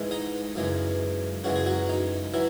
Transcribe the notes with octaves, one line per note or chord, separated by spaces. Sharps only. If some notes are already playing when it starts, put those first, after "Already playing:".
Already playing: G#2 E3 G#3
D#4 D#5
F#2 C#3 E3 G#3
F#2 C#3 E3 G#3 F#4
G#4
F#3 F#4
D#4
E3 F#3 E4